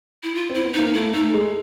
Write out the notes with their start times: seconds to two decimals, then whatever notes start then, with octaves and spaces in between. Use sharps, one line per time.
0.23 E4
0.35 F4
0.50 C4
0.55 E4
0.65 B3
0.74 D#4
0.79 A#3
0.94 A3 E4
1.13 A3 D#4
1.34 G#3